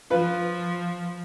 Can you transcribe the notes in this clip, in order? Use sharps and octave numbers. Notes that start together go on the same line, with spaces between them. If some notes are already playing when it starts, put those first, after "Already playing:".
F3 F4 B4